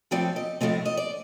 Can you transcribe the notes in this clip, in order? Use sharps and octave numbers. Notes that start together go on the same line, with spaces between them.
A2 F3 A3 C4 D5
D#5
A2 F3 A3 C4 D#5
D#5
D5